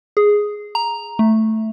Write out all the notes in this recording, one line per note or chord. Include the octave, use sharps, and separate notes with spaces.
G#4
A#5
A3